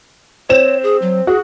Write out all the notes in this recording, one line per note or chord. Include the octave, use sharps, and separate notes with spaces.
C4 C#5 E7
G#4
F#3
F#4 G#4